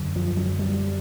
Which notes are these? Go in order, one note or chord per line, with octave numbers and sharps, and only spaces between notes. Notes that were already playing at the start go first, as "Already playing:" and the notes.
Already playing: F#2 D3
F3
F#3
G3